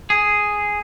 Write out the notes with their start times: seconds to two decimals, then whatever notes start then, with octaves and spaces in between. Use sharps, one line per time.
0.10 G#4